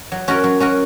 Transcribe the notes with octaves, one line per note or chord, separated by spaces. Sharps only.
F#3
C#4 F#4 A#4
F#3
C#4 F#4 A#4